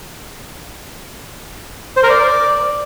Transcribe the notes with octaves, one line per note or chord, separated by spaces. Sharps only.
C5
A#4
D5